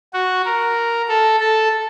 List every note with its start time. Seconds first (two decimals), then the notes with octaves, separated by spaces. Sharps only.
0.14 F#4
0.46 A#4
1.08 A4
1.40 A4